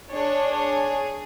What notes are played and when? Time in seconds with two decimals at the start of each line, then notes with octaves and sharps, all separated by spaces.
0.12 D4 G#4 C#5
0.54 C#5